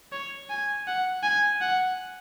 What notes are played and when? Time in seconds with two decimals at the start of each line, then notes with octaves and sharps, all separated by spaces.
0.12 C#5
0.50 G#5
0.87 F#5
1.23 G#5
1.61 F#5